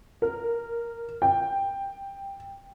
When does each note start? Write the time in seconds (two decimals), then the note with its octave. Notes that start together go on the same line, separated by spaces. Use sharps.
0.22 A#4
1.22 G5